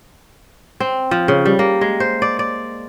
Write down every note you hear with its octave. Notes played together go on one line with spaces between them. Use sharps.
C4
F3
C#3
G3
A#3
G#3
C5
D5
D5